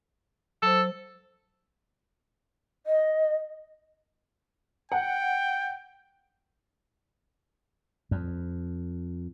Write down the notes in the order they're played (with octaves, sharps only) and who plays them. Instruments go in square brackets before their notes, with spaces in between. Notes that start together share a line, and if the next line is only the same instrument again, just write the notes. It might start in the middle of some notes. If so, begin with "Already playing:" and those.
[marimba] F#3 C5 [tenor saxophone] A4
[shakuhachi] D#5
[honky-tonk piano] F#5 [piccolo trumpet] G5
[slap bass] F2